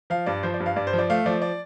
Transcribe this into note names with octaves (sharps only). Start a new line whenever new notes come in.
F3 F5
G2 D5
F3 C5
D5
G2
F5
G2 D5
C5
F3
D5
A3 F5
F3 D5
D5